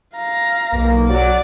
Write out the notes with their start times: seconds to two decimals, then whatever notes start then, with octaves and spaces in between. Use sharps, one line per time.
0.16 F5 A#5
0.73 B1 A#3
1.09 F#3 F#4 D5 D6